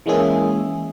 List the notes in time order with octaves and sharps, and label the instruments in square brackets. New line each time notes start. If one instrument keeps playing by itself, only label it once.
[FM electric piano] E3 G#3 A#3 C#4 G#4 E5